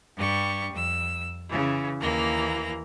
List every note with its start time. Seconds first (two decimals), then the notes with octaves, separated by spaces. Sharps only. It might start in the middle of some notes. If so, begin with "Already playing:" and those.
0.16 G2 G3 C#6
0.72 F2 E6
1.49 C#3 E3
2.00 D#2 E3 A#3 A#5